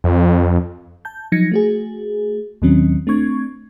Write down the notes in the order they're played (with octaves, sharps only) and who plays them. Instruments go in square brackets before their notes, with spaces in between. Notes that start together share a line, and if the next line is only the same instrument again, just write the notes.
[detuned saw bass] F2
[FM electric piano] A5 G6
F3 F#3 D#4 G#6 A#6 C#7
A3 F#4 G#4
D#2 A#2 D#3 F#3 C4 C#4
A3 C4 D4 C#6 G#6